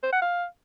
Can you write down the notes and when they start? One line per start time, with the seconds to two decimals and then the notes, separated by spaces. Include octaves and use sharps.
0.03 C5
0.12 F#5
0.22 F5